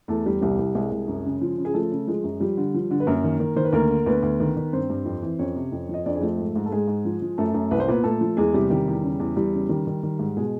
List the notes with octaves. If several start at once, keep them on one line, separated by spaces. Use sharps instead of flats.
E2 A3 A4
E2 G3 G4
C2 G3 G4
C2
C2 G#3 G#4
C2
F#2
C#3
F3
C#3
G#4
F3 A3 A4
C#3
F3 G#3 G#4
F#2
F3 G3 G4
D3
F3
D3
B4
F#2 A#3 A#4
D#3
D#3
D#3 C5
B4
D2 A#3 A#4
D3
D2 B3 B4
D2
D#3
D#3
G2 C4 C5
G2
F2
E3
F2 C#4 C#5
C3
F2
F3 D#5
F2 D4 D5
G#4
F3 A3 A4
G#2
G#2
A4
G#2 G#3 G#4
G#2
F3
F3
F#2 A3 A4
F#2
C2 B4
C5
A#2 B3 B4
A#2 A3 A4
F3
E2 G#3 G#4
C3 G3 G4
D#3 G3 G4
E2
C#3
E2
E2 G3 G4
C#3
D#3 G3 G4
D#3
D#3
G#2
B2 G#3 G#4